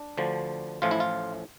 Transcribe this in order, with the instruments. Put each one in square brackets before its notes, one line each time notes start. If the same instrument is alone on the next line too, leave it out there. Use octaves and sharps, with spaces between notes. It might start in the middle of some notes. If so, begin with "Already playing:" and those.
Already playing: [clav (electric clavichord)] D4
D2 D3 F3
A1 A2 F3 F4
E4
F4